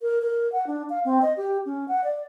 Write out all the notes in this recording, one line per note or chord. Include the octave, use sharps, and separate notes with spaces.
A#4
A#4
F#5
D4
F5
C4
D#5
G4
C#4
F#5
D5